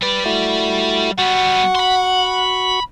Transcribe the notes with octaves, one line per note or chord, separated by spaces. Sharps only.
G3 B4 D5
A3 E4 F#4
G3 B3 F#4 F#5 C#6
B5 C6